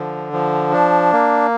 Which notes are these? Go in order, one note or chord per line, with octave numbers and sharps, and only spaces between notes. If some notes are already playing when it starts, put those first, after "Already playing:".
Already playing: D3 F3
F3
D4
A#3